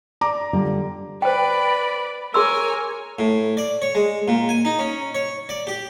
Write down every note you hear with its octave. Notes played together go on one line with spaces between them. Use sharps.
D5 A#5 D6
D3 G3 F4
B4 C5 D5 G5 B5
G#4 A#4 C#5 G#5 C6 E6
A2
D5
C#5
G#3
A#2
G#5
D#4
C#4
C#5
D5
G4